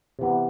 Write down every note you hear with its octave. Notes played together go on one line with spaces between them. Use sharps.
C3 E3 B3